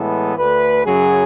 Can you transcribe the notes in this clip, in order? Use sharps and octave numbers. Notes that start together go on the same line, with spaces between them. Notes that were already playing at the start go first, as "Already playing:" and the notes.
Already playing: A2 E3 G#3 B3 A4
D2 D3 A3 B4
F#2 C#3 F#3 G#4